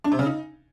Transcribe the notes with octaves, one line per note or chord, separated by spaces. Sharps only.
D4
C3
C#3
D#4